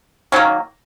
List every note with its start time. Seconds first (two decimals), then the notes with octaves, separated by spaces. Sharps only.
0.32 D#3 F#3 A#3 C#4